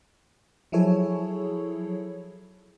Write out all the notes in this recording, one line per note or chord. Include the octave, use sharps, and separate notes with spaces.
F3 F#3 E4 G#4 A4 C#5